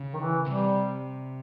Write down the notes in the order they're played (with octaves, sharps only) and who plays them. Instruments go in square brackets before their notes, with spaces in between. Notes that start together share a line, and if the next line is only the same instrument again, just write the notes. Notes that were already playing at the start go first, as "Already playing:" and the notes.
Already playing: [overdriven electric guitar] C#3
[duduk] D#3
E3
[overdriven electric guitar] C3 [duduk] G3